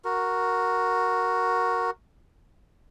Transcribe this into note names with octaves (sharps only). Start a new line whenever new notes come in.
F#4 A#4